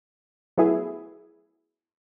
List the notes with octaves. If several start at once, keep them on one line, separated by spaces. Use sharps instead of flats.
F#3 A3 B3 E4 G#4